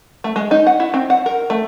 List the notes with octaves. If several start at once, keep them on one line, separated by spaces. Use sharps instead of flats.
A3
G#3
D#4
F#5
E4
C4
F#5
A#4
A3